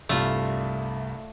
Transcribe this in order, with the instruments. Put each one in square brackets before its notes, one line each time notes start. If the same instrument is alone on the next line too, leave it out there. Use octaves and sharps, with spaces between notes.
[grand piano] C2 G2 [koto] A3 F4